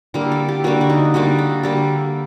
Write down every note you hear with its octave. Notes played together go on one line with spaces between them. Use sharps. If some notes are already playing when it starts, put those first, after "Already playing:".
D3 G3 A#3 A#4
A4
G4
D3 G3 A#3 F#4
F#4
D#4
D3 G3 A#3 F#4
A4
D3 G3 A#3 A4